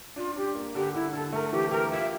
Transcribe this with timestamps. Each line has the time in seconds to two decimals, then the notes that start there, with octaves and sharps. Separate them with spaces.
0.16 D4 F4
0.36 D4 G4
0.55 A#3
0.74 D3 G4
0.94 D3 E4
1.13 D3 A4
1.32 A3 A#4
1.52 E3 G4
1.71 G4 A#4
1.91 F4 E5